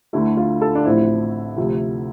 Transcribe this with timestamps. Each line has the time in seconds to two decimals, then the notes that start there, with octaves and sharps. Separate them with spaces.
0.13 D2 D3 A3 E4
0.37 F4
0.61 A4
0.75 D4
0.85 A1 A2 F3 C4 E4
1.57 D2 C3 F3